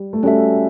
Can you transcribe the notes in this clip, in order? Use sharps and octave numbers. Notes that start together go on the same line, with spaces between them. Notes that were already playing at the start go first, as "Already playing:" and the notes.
Already playing: G3
A3
G3 C#4 F#4 A4 E5